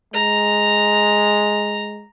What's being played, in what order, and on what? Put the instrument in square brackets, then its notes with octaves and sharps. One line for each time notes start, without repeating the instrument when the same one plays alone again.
[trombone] G#3 [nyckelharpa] A#5